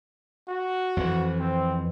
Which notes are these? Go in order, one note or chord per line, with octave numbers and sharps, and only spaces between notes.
F#4
F2 E3
C4